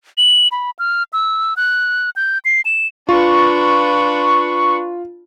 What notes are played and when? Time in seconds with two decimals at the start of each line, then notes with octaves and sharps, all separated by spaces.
0.18 F#7
0.52 B5
0.79 F6
1.13 E6
1.57 F#6
2.16 G6
2.45 C7
2.65 E7
3.09 D4 F4 B4 C#6